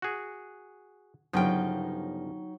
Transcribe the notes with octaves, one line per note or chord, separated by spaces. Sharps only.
F#4 G#4
G1 C#3 F3 F#3 D#4 G5